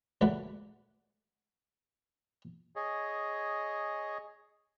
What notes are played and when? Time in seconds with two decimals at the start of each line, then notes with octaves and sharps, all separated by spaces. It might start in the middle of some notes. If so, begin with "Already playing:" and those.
0.21 C#2 A#2 F#3 A3 B4
2.76 G#4 C#5 D#5